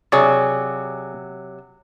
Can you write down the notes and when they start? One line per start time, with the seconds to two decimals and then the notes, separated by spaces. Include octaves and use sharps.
0.12 C3 F#3 G#4 C#5 D5